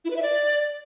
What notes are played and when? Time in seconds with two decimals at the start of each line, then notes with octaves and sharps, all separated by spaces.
0.05 E4
0.11 B4
0.16 E5
0.22 D5